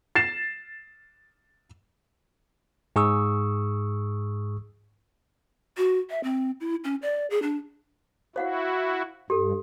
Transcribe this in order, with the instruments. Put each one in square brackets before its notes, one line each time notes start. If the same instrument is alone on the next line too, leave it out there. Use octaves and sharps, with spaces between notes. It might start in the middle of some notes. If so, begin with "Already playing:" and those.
[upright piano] A6 C7 E7
[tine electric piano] G#2 G#4 C#6 D#6 E6
[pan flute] F#4
E5
C4
E4
C#4
D5
G#4
D4
[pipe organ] E4 F#4 [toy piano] C5 F5 F#5
[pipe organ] G2 [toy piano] G4 A4